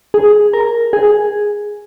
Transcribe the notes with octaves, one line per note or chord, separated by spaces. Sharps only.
G#4
A#4
G#4